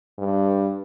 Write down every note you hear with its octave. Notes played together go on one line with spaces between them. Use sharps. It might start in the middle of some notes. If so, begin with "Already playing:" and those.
G2